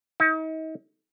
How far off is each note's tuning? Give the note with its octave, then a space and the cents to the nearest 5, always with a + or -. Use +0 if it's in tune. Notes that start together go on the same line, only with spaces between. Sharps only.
D#4 +40